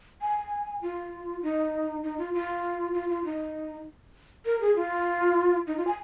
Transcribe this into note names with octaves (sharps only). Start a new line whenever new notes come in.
G#5
F4
D#4
D#4
F4
F4
F4
F4
D#4
A#4
G#4
F4
D#4
F4
G#5